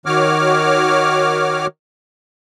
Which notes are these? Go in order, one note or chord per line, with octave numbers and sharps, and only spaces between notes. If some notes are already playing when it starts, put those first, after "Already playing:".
D#3 F#4 C#5 D6 F6